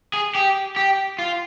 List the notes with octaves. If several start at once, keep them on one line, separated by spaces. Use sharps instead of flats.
G#4
G4
G4
F4